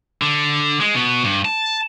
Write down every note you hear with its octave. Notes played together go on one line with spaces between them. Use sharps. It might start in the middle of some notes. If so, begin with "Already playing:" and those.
D3
G#3
B2 B3
G2
A5